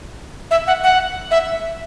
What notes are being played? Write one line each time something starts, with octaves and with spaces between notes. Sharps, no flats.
E5
F#5
F#5
E5